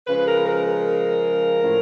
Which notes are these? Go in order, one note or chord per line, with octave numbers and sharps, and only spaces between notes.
C#3 F3 G#3 B4
A#4
A#4
A#4
A2 F3 A3